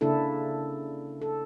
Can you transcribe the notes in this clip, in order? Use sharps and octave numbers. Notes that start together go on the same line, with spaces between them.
C#3 A#3 D4 E4 A4
A4